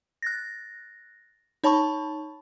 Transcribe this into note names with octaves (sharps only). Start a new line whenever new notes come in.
F#6 A6 A#6
D#4 C#5 A5 B5 C#6